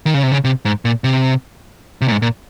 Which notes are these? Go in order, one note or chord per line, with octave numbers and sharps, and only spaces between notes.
D#3
C#3
C3
C#3
C3
G#2
A#2
C3
C3
A#2
G#2
A#2